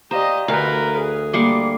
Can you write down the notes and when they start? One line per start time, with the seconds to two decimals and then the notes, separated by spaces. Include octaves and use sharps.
0.11 G4 C5 D5 D#5 F5 A#5
0.48 D2 A#4 B4 F5 A#5
0.98 G#4
1.33 G3 A#3 C6 D6 C7 C#7